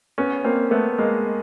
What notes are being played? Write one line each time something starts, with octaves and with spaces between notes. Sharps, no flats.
B3 C#4
A#3 C4
A3 B3
G#3 A#3